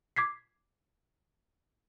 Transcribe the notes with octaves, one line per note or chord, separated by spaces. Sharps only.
D6 G#6 B6 C7